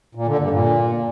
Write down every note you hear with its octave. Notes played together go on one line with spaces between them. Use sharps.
A#2
D3
G2
A#2